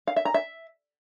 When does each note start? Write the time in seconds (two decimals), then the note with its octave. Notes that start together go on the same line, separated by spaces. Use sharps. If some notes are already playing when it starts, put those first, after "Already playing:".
0.07 F5
0.16 E5
0.25 A#5
0.34 E5